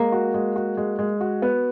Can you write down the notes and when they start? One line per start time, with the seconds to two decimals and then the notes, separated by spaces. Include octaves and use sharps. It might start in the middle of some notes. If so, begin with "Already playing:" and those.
Already playing: G#3 A#3
0.12 F#4
0.34 G#3
0.56 F#4
0.77 G#3
0.99 G#3
1.21 F#4
1.42 B3